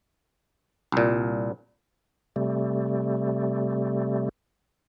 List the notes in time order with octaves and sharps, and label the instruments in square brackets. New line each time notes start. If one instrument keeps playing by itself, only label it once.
[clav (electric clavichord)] C2 A#2
[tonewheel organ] C3 G3 A3